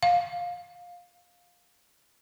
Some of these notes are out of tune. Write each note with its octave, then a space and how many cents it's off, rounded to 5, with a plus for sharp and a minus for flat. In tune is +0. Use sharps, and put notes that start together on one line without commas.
F5 +15